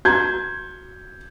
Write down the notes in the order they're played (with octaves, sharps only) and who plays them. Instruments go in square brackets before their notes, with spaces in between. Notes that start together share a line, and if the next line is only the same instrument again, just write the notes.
[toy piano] F#4 A#5 [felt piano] G6 G#6